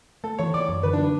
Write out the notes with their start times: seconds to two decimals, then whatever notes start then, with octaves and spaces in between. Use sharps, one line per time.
0.24 A3 A4
0.39 E3 C#5
0.54 E3 D5
0.69 F#2
0.83 D3 B4
0.93 D4
0.98 F#3